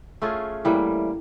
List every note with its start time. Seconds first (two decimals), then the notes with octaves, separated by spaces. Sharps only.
0.22 A3 C#4 F4 G#4
0.65 A2 E3 G3 A#3